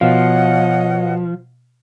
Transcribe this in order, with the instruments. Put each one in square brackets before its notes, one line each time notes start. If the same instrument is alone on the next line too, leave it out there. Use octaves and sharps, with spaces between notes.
[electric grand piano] B2 F5 [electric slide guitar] F3 [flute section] C#5 D#5 F#5